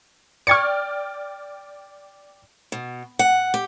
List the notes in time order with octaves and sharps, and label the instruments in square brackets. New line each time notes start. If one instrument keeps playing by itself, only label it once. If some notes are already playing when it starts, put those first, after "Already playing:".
[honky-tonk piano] D5 G5 F6 [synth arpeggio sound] C#6 G#6 C#7
[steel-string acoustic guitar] B2
F#5
G4